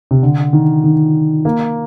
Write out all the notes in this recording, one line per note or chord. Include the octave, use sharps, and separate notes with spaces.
C3
D3
D#3
D#3
A#3